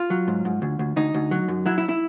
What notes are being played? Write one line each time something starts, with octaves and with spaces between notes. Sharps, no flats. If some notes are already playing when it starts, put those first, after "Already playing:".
Already playing: F4
F#3
G#2
G#2
D2
D2
D2 D#4
D2
F#3
F#2
F#3 E4
E4
E4